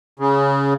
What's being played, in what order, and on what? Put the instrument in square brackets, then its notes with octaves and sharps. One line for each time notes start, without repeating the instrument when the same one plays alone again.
[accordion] C#3